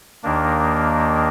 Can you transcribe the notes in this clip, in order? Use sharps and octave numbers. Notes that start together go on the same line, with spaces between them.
D#2 D#3 A#3 D4